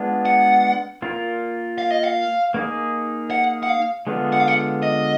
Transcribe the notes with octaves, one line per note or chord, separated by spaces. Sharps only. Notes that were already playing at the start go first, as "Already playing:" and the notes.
Already playing: G#3 B3 D4 F4
F#5
A#3 F4 A#4
F5
D#5
F5
A#3 D#4 G#4
F#5
F#5
F5
D3 G#3 B3 F4
F#5
F5
F#5
D#5